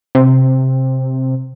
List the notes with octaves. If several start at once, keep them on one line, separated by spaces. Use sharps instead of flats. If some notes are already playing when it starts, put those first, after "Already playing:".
C3